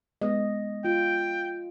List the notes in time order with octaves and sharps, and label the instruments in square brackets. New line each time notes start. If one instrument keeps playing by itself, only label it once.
[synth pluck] G#3 B3 [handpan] D#5
[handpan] F4 [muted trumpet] G5